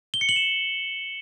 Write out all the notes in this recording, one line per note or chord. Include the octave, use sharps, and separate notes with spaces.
G7
C#7
F#7
E7